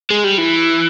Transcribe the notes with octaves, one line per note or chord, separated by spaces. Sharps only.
G#3
G3
E3